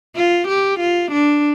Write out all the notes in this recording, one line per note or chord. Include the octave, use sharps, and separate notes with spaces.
F4
G4
F4
D4